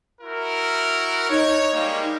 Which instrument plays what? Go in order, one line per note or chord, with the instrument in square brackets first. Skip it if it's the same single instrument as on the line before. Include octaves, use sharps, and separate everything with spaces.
[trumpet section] E4 F#4 A#4
[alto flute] D#4 [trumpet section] C#5
[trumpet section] G3 G#3 A#3